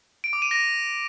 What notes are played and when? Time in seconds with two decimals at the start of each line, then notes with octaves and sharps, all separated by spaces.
0.24 D7
0.33 D6
0.42 D#7
0.51 A#6